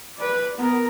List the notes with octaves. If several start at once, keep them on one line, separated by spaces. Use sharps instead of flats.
B4 D5
B3 A#4